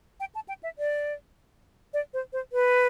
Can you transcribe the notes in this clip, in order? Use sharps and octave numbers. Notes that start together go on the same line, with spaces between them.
G5
A5
G5
E5
D5
D5
C5
C5
B4